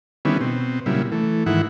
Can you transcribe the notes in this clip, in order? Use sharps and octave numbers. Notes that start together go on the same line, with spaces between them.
D3 D#3 G3 B3 C#4 E4
B2 C4
A#2 C#3 F#3 G3 E4
E3 A3
G#2 D#3 E3 E4 F#5